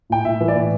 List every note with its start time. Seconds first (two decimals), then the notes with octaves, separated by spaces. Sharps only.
0.10 A2 G5
0.25 A2 E5
0.41 E3
0.48 D5
0.56 A2